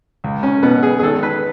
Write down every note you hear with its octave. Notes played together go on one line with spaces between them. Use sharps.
C#2
C#4
B2 B3
G#4
G#4
G#1 A4
B4